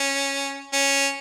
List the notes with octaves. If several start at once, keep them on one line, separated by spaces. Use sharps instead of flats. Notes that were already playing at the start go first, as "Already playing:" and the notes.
Already playing: C#4
C#4